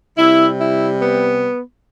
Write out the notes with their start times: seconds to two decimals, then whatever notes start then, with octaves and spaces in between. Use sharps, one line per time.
0.18 C3 G3 E4
0.59 E4
1.01 B3